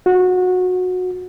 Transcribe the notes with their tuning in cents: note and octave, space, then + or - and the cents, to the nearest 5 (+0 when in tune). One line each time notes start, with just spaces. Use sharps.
F#4 -20